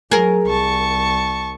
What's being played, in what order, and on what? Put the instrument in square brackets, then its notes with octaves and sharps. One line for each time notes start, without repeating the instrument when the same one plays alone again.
[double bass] F#3 [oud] G#4 A#4
[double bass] C2 [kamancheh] A5 C#6